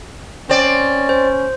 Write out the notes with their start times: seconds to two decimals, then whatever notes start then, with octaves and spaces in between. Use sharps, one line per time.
0.49 C4 C#4 D5
1.09 C5